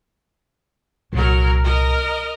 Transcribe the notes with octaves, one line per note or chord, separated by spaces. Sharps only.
C2 A#2 F#3 A#4
A#4 D#5